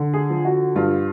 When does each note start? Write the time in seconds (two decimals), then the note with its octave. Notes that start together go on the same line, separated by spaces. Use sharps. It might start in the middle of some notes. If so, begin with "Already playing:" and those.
Already playing: D3
0.13 G#4
0.30 F3
0.45 F#4
0.75 G2 F4